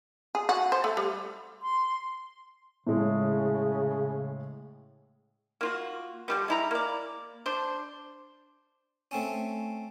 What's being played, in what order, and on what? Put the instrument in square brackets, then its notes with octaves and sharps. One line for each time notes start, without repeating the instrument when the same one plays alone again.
[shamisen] G#4
F#4
C5
A3
G3
[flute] C6
[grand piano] A2 G#3 [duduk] C#3
[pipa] A#3 F4 F#4
D3 G3 B3
G#3 E4 A#5
A#3 D5
D4 C5
[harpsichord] A3 C4 C#4